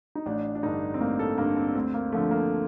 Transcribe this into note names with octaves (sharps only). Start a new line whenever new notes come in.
D#4
A1 D4
D4
G2 D3 D#4
C4
A1 A#3
A4
G2 D3 A#3
C4
D2 C4
A#3
D3 F3 A3
A#3